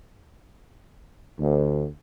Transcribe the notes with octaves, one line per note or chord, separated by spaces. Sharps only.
D2